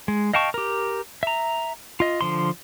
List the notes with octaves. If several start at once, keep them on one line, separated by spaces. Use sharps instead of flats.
G#3
D#5 F5 G5 A5 C#6
G4 A#4
E5 A#5
F4 D#5
D3 F3 C6